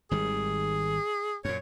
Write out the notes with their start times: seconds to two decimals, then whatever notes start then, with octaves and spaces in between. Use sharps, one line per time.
0.11 G#1 D#3 G3 G#4
1.45 F#2 A#2 C#5